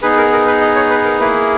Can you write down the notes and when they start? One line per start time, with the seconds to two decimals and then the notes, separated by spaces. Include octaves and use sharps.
0.02 B3 D#4 G#4 B4
0.17 A#4
0.32 A#4
0.47 B4
0.61 D#5
0.75 C#5
0.90 B4
1.05 A#4
1.19 A#3 E4 G#4 B4